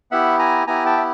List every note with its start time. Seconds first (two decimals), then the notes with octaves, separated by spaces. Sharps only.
0.11 B3 E4 G4 E5 F#5
0.39 G#5 A#5
0.67 B3 E4 G4 G#5 A#5
0.86 G5 A5
0.97 E5